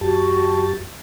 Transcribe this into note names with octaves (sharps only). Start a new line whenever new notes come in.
F#2 F#4 G4 A5